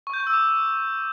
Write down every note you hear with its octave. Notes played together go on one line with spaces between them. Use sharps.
C#6
G6
C#6
E6
D6